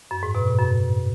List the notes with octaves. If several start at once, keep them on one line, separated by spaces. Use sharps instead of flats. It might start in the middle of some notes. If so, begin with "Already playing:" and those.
F#2
G#2
B2
A2
F#2